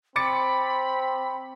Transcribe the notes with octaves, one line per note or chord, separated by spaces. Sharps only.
C4 B5 D6 A6 C#7